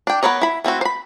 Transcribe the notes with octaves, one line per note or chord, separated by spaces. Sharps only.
D4 G5
B3 A#4 B4 C#5 D#5
E4 B5
A3 C4 E4 F#4
C5 B5